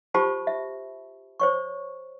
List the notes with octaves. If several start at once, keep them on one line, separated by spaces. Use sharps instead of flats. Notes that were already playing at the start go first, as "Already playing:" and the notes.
F4 G4 C5 A5 B5 C#6
E5
C5 C#5 C#6